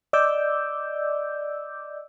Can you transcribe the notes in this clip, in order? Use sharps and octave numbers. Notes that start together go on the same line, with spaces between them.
D5 D#5 D6 E6 G6